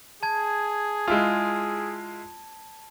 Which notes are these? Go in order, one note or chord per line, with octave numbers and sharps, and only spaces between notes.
G#4 A5 G#6
G#3 E4 F4